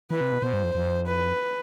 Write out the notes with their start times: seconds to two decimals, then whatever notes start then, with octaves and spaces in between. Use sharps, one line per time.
0.11 E3 B4
0.21 C3
0.32 B2
0.42 B2 C5
0.53 G2
0.64 F2
0.75 F2
1.06 B4